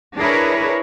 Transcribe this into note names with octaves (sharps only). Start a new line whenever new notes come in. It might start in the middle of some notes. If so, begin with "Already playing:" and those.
D4 E4 G#4 A#4 B4 C#5